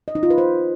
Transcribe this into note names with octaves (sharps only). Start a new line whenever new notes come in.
D#5
D#4
F4
B4
C5